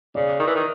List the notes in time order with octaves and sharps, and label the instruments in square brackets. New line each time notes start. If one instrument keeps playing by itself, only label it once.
[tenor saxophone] C#3 [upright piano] D5
[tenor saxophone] D#3
E3
D#3